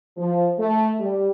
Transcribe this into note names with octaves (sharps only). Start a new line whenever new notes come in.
F3
A3
G3